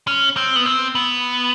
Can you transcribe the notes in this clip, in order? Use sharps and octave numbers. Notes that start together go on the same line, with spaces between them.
C#4
C4
B3
C4
B3